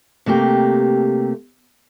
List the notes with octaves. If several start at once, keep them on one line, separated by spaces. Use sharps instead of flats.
C3 A3 A#3 G4